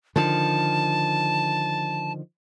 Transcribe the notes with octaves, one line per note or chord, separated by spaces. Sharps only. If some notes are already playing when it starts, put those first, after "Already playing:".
D3 D#3 F3 A5